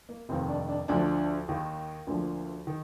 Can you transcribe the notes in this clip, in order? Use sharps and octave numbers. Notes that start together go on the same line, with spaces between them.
A#3
F1 D#2 D#3 C4
D4
D4
D2 D3 F3 D4
D#2 D#3
D2 D3 F3 A#3
D#3